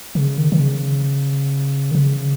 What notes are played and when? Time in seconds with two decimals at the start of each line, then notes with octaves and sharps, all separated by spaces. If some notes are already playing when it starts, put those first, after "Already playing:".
0.15 C#3
0.38 D#3
0.52 D#3
0.60 C#3
1.91 D#3
1.95 C#3